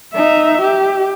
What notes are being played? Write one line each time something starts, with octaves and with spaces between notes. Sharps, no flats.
D#4 E5
G4